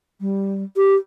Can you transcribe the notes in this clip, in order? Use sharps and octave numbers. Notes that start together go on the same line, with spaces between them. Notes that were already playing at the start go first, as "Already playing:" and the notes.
G3
G4